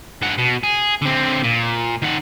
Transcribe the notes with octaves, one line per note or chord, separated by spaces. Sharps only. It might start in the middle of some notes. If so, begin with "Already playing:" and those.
G2 F#5
B2
G#4
D3 C4
A#2
D#3 F#5